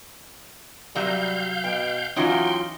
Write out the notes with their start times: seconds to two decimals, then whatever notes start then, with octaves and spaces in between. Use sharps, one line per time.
0.95 C3 F#3 G3 F5 G6
1.64 B2 G5
2.16 E3 F#3 C#4 D#4 F4 G5 C6